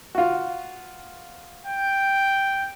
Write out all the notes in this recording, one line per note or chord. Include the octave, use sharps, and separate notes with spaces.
F4 F#4
G5